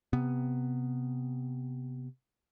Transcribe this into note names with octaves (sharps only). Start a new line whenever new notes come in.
C3 B3